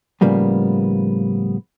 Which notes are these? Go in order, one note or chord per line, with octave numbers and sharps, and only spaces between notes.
A2 C#3 F3 G3 A#3 B3